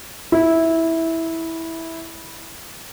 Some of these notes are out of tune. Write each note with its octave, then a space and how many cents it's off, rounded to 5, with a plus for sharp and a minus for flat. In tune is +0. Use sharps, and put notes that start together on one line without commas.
E4 -10